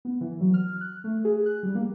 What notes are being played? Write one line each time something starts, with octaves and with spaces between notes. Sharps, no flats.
B3
E3
F#3
F6
F#6
A3
G#4
F#6
G3
A#3